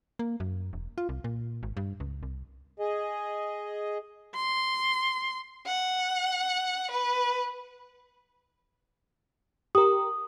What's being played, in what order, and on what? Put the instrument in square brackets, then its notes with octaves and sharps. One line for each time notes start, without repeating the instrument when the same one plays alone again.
[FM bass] A#3
F#2
E1
F4
C2
A#2
G#1
G2
C#2
C2
[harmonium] G#4 D#5
[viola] C6
[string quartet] F#5
B4
[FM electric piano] G4 A#4 [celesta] D#6